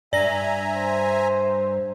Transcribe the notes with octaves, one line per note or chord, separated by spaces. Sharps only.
G2 D5 E5 G#5 A#5 A#6
C5